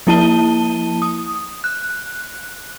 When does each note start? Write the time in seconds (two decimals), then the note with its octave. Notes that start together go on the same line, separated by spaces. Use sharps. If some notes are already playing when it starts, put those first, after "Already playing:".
0.07 F3 A#3 E4 A5 D#7 G7
1.02 D#6
1.64 F#6